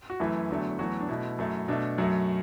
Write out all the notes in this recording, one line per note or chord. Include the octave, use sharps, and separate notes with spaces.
F#4
F#2 E3 A3 E4
E2 D3 F#3 A3
E2 E3 F#3 A3 F#4
D4
B2 A3 E4
F#2 F#3 A3
B2 A3 D4
F#2 F#3 A3